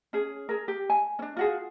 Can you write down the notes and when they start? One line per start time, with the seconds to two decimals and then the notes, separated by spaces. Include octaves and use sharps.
0.13 C#4 G#4
0.49 G#4 A#4
0.68 G4
0.90 G#5
1.19 C#4 D4
1.37 F4 F#4 G#4